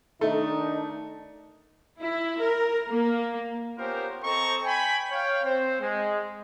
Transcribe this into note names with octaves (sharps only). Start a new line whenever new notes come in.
D#3 A3 D4 D#4
E4
A#4
A#3
B3 C#4 F4 G4 A#4 C5
C4 A4 C5 D#5 A#5 C#6
G5 G#5 B5
C#5 F5 G5
C4 C5
G#3